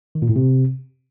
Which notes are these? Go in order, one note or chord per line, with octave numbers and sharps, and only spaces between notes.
D#3
A#2
A2
C3